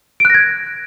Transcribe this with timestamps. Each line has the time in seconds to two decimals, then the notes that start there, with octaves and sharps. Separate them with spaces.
0.20 D7
0.25 F#6
0.30 A#6
0.35 G#6